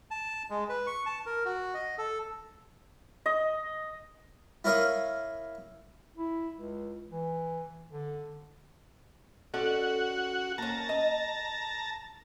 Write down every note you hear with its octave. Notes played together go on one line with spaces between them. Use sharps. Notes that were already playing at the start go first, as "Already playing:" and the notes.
A5
G#3
B4
C#6
A5
A#4
F#4
D#5
A4
D#5
E4 A#4 C#5 F5 D#6
E4
C#2
E3
D3
C#4 F#4 A4 D5 F#5
A#3 C#4 A5 A#5
D#5